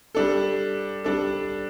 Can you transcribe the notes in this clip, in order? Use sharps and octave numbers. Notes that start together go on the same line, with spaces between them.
G3 D4 A4
G3 D4 A4